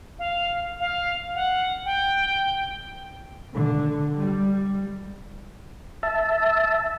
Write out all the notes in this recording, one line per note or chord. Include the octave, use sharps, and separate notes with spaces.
F5
F5
F#5
G5
D3
G3
E5 A5